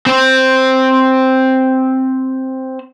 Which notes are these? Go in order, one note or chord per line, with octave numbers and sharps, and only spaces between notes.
C4 C5